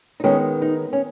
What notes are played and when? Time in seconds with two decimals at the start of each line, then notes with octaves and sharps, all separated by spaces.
0.20 D#4
0.24 D#3 G#3 B3 C#4
0.62 D#4
0.93 C#4